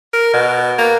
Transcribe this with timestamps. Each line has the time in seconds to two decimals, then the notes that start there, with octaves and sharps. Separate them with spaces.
0.13 A#4
0.33 B2
0.79 A#3